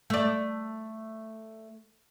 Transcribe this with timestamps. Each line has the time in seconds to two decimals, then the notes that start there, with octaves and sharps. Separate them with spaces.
0.10 A3 D5